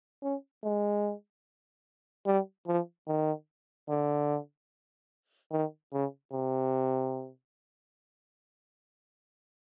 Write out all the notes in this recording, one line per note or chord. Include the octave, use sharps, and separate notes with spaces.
C#4
G#3
G3
F3
D#3
D3
D#3
C#3
C3